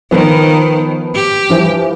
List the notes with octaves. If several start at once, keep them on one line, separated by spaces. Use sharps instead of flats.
D#3 F3 B3
G4
E3 F3 G3